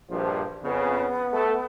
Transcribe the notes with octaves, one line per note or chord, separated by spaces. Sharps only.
A#1 G2 F3
F2 C#3 B3
A3 A4